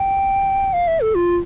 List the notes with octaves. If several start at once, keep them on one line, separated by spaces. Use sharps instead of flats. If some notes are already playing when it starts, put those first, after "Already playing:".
Already playing: G5
F5
E5
A4
F4